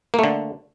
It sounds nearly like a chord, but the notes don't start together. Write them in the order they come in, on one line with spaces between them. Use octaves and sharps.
A#3 A3 D3